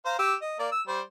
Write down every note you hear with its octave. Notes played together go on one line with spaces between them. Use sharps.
C5 F5 A#5
G4 E6
D#5
A#3 A#4 D5
E6
G3 C5